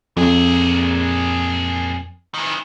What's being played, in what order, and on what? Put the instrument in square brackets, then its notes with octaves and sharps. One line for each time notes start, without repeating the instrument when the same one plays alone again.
[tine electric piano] F2 [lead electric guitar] A#2 G#4
[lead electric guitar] D#3 E3